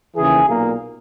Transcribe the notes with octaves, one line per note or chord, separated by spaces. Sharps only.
D#2 C#3 E3 G#4
B1 A#2 A#3